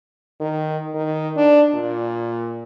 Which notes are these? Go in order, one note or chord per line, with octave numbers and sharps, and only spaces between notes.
D#3
D#3
D4
A#2